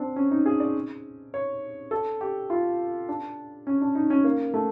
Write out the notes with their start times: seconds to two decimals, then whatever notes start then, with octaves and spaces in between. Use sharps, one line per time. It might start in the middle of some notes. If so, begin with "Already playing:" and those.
Already playing: C4 D4
0.16 C#4
0.31 D#4
0.46 G#4
0.60 D5
1.34 C#5
1.91 A4
2.21 G4
2.50 F4
3.09 D4
3.67 C#4
3.81 D4
3.95 D#4
4.10 C#4
4.24 A#3
4.54 A3